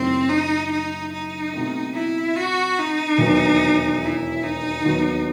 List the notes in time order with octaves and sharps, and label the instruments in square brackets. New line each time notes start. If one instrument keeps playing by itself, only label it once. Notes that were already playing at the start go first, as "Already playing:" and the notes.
Already playing: [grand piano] F#1 F#2 D#3 A3 E4 [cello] C4
[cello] D#4
D#4
D#4
[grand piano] B2 A3 C4
[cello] E4
F#4
D#4
[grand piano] E1 D#2 D#3 F#3 B3
[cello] E4
D#4
[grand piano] D#2 D#3 F#3 B3